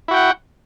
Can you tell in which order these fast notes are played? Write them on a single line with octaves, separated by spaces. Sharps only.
E4 F#4 G5 F#5